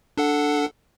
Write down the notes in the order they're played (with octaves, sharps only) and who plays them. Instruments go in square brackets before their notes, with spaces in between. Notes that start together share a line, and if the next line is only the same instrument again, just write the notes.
[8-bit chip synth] D4 A4 F#5